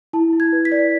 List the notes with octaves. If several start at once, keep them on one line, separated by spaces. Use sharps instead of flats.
E4 A5
E4
G#6
B4
B6
D5